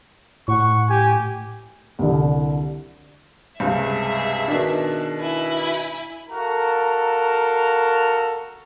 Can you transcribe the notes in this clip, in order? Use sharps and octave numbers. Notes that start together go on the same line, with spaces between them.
A2 F#5 C#6
G4 G#5
C2 D3
C#2 G2 C3 G#4 E5
B2 D#3 D4
E4 G#5
F#4 A4 A#4 F5 A#5